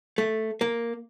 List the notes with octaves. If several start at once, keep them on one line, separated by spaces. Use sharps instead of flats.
A3
A#3